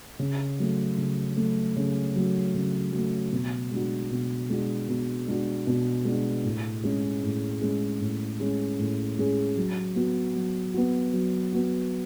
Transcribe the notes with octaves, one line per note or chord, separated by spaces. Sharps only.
C#3
F#3 A3
C#3
F#3 A3
C#3
F#3 A3
C#3
F#3 A3
B2
G#3 D4 F#4
B2
G#3 D4 F#4
B2
G#3 D4 F#4
B2
G#3 D4 F#4
A2
G#3 C#4 G#4
A2
G#3 C#4 G#4
A2
G#3 C#4 G#4
A2
G#3 C#4 G#4
F#3
B3 F#4
F#3
B3 F#4
F#3
B3 F#4